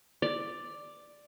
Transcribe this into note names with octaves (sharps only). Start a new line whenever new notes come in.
D5